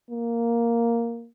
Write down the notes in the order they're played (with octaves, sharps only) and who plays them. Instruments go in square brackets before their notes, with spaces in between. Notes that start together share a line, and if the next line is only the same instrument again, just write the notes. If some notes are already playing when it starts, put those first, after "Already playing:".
[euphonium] A#3